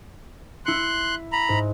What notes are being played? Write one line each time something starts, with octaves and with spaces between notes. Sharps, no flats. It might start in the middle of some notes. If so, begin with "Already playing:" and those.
E4 C6 F#6 C#7
A#5 B5
G#2